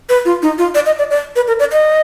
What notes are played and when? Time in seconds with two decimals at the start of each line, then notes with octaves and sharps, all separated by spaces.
0.09 B4
0.25 F4
0.42 D#4
0.58 F4
0.75 D5
0.86 D#5
0.99 D5
1.11 D5
1.36 B4
1.48 A#4
1.59 D5
1.72 D#5